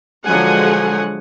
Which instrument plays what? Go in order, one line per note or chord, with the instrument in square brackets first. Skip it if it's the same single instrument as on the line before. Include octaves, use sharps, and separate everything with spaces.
[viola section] D3 F3 F#3 G#3 F#5 G#5